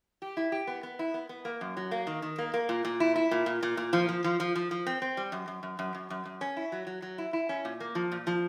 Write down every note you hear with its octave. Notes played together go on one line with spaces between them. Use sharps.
G4
E4
G4
B3
B3
E4
B3
B3
A#3
F#2
F#3
A#3
D#3
D#3
A#3
A#3
A#2
A#2
E4
E4
A#2
A#2
A#2
A#2
F3
F3
F3
F3
F3
F3
C4
C4
G3
F#2
F#2
F#2
F#2
F#2
F#2
F#2
C#4
E4
F#3
F#3
F#3
E4
E4
C#4
A#2
A#3
F3
A#2
F3